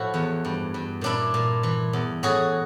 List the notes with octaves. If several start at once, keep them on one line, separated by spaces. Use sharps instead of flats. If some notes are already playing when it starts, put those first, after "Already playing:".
Already playing: A2 F3 E4 F#4
E2
G2
G2
A#2 D4 E4
A#2
E3
E2
A2 F#4 G#4